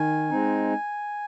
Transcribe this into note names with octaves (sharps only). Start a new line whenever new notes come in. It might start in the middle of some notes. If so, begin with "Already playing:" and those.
Already playing: D#3 G#5
G#3 C4 D#4